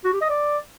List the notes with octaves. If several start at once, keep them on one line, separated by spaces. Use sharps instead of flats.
F#4
G4
D#5
D5